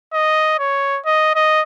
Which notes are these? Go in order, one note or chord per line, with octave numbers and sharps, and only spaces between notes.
D#5
C#5
D#5
D#5